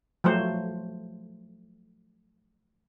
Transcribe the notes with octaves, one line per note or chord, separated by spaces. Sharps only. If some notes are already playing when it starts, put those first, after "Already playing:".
F3 F#3 A3 C5